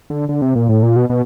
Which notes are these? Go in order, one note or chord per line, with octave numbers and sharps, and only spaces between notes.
D3
D3
C3
A#2
A2
A#2
B2
B2